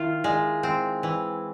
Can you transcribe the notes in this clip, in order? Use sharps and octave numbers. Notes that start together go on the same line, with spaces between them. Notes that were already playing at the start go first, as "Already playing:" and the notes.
Already playing: D#3 E4 F4 E5
G#3
C4
E3